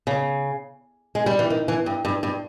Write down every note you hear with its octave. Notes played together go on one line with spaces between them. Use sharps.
C#3
G#3
G3
E3
D#3
E3
G2
G2
G2